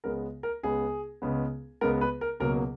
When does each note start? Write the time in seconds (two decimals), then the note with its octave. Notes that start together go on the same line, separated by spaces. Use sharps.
0.04 C#2 C#3 G#3 B3 A#4
0.43 A#4
0.63 C#2 C#3 G#3 B3 G#4
1.22 C#2 C#3 G#3 B3
1.81 C#2 C#3 G#3 B3 A#4
2.01 B4
2.21 A#4
2.40 C#2 B2 F#3 A#3 A#4